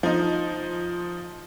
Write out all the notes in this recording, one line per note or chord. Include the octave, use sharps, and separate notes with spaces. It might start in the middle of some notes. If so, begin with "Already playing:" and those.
F3 D#4